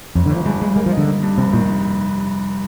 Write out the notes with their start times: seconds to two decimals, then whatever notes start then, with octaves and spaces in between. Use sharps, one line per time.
0.15 G1 F2
0.26 D3
0.30 G1
0.35 F3
0.46 G2 G#3
0.61 G2 G#3
0.76 G#3 A#3
0.86 F3
0.92 D#4
0.97 D3
1.07 A#3
1.23 G2
1.38 F1 C3
1.53 A#2 D#3